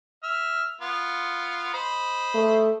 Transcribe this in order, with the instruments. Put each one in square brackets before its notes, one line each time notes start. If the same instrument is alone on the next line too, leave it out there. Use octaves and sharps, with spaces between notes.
[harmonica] E5 F6
B3 F4
C5 D#5 B5
[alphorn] A3